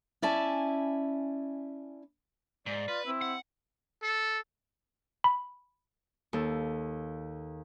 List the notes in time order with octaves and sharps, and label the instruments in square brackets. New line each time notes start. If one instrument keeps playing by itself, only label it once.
[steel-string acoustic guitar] C#4 E4 D5 E5 G#5 A5
[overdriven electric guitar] G#2 [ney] D5
[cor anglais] F4 [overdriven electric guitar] B4
[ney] C4 [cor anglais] E4
[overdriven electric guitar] F#5
[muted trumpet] A4
[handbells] B5
[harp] D#2 A4